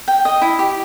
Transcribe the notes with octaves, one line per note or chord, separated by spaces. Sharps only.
G5
D#5
E4
G4